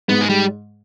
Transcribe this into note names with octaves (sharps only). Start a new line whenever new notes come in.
G#2 B3
G#3
G3